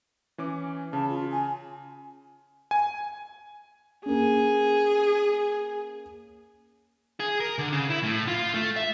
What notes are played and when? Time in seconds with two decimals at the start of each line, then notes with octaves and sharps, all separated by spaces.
0.38 E3 C#4 D6
0.93 C#3 A5
1.09 F4
1.32 G#5
2.71 G#5
4.06 A#3 C#4 G#4
7.20 G#4
7.40 A#4
7.58 D3
7.72 C#3
7.90 E4
8.03 A2
8.28 F4
8.54 A3
8.76 E5